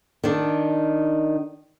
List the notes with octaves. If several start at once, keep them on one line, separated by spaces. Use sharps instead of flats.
D#3 D4